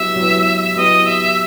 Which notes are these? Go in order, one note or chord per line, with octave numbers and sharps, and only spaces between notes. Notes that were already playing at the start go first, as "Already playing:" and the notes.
Already playing: F#3 B3 E4 G4 E5
F#3 B3 E4 G4 B4
F#3 B3 E4 G4 B4 D#5
E5